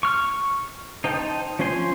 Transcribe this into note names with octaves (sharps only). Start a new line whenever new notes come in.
C#6 F6
D#4 C5 G5 A5 G6
F3 C#4 C5 G#5 C6